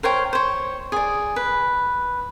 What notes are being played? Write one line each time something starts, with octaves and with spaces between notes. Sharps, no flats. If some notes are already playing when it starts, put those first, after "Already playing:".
A#4 C5 C#5 G5
C5 C#5
G#4 D5
B4